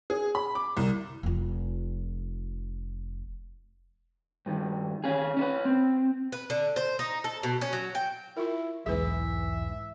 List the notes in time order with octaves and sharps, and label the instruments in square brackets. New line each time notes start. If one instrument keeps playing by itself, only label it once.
[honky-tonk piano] G#4
B5
D6
C2
[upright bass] F1 F4
[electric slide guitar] G2 D#3
D#3 C#4 G#4
C#4 D4 B4
C4
[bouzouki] B4
D3
C5
D#4
A4
B2
C#4
F#3
G5
[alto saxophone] E4 [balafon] F4 A#4
[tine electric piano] B1 E2 G#2 [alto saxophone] E3 [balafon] G#4 B4 [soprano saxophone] E5